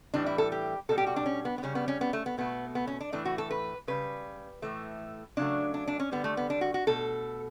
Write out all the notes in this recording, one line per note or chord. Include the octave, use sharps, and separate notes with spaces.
A2 E3 G3 D4
E4
A4
G4
B2 G3 A4
G4
F#4
D4
C#4
B3
B3
C#3 G3 C#4
B3
C#4
B3
A3
B3
B2 A3 B3
B3
C#4
D4
A2 E3 A3 D4
F#4
A4
B4
C#3 G3 B4
A2 E3 A3
C#3 F#3 A3 D4
D4
D4
C#4
D3 G3 B3
A3
B3
D4
F#4
F#4
B2 A3 A4